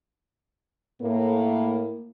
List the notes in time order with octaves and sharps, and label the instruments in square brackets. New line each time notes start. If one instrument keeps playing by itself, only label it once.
[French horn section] A2 A#3